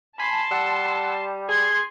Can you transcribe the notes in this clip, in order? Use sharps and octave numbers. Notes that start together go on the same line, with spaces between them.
G#5 A5 B5 C6 B6
G3 F#5 E6
G#4 C6 G#6